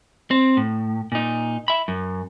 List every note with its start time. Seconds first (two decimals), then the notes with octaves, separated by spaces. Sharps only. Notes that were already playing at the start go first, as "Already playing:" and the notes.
0.31 C4
0.57 A2
1.12 A#2 D#4
1.68 E5 B5
1.88 F#2